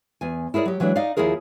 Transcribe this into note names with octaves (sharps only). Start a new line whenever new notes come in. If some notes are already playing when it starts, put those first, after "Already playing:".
E2 G#5
E4 G#4 A#4 C5 D5
F#3 G4
E3 F#3 G#3 D4 E4
D#4 D5 D#5 F5
D#2 F3 E4 G#4 A#4